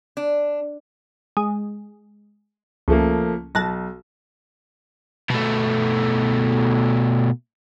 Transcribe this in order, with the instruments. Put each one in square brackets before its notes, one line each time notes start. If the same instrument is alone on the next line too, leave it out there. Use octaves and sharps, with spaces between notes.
[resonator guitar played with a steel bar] D4
[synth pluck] G#3
[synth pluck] C#2 [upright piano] F3 A3 A#3
[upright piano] B1 [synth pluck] A5 F#6 A#6
[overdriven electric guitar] B2 A3